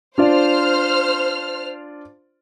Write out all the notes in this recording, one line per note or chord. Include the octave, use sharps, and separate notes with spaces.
D4 F4 C5 D5 F6